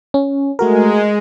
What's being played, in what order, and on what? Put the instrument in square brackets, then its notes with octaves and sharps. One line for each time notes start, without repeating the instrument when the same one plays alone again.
[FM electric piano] C#4
[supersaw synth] G#3 [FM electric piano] A3 F#4 A#4